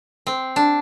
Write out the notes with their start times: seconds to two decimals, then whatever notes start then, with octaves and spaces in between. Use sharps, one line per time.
0.27 C4
0.56 D4